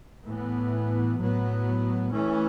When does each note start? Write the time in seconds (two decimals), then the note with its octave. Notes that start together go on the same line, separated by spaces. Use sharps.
0.24 A2 E3 B3
1.18 A2 F#3 B3
2.12 E3 A3 C#4